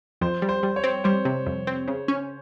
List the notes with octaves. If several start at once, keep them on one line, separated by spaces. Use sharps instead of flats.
F2 C5
G3
C5
G3
C#5
C4
G3 C5
C3
F2
C4
C#3
C#4